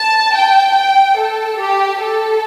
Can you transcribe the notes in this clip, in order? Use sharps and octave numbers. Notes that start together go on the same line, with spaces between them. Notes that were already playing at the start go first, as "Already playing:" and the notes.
Already playing: A5
G5
G5
A4
G4
A4